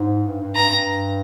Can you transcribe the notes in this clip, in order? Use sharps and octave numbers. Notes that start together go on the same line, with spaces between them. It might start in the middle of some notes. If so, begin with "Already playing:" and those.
Already playing: G#2
G2
G2
G2 A#5
G2